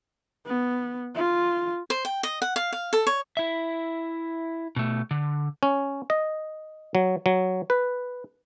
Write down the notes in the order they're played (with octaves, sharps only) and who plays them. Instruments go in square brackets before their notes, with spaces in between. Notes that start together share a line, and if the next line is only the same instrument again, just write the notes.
[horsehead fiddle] B3
F4
[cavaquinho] C5
G5
D#5
F#5
F5
F5
A4
C#5
[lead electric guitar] E4 E5
B2 A3
D3
[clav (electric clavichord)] C#4
D#5
F#3
F#3
B4